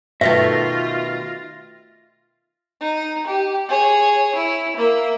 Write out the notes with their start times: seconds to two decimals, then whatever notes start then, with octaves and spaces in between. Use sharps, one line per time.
0.21 B2 D#3 A3 F4 E5 A6 A#6
2.81 D#4
3.27 G4
3.69 G#4 C#5
4.35 E4
4.76 A#3 E5